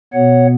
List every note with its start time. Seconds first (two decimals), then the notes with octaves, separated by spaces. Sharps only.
0.13 B2 B3 C#5 F#5